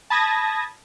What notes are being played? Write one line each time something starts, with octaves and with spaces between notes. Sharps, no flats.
A5 B5 D#6 G#6 A#6